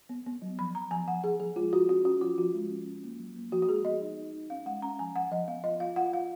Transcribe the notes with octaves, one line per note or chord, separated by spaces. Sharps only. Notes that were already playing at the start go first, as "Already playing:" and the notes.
B3
B3
F#3
F3 B5
B3 A#5
F3 G#5
F3 F#5
F3 G#4
F3 G#4
G#3 F4
F4 F#4
C#4 F#4
C#4 F#4
F3 F4
F3 F#4
G#3
C#4
C#4
A#3
F#3
A#3
F3 F#4
F#4
G#3 G#4
B3 D#5
D#4
D#4
D#4
C#4 F5
G#3 F#5
C#4 A#5
F3 G#5
F3 F#5
F3 D#5
B3 F5
F4 D#5
F4 F5
F4 F#5
F4 F5